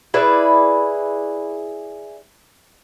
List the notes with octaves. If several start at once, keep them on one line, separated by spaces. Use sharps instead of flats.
E4 G#4 B4 D5